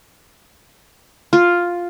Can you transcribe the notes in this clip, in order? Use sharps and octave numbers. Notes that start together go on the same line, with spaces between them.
F4